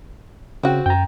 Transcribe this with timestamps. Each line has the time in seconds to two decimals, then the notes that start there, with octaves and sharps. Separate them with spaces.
0.63 C#3 C4 F#4
0.86 F#2 G5 A#5